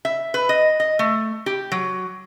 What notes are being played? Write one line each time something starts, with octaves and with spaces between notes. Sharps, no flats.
E5
B4
D#5
D#5
A3
G4
F#3